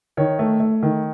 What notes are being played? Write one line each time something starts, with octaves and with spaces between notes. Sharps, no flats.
D#3 C#5
A3
A3
D#3